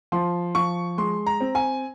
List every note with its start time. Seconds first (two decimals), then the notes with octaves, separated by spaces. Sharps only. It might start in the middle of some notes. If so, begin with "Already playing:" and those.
0.12 F3 C6
0.55 F3 C#6
0.98 G#3 C6
1.26 A#5
1.40 C4
1.55 G#5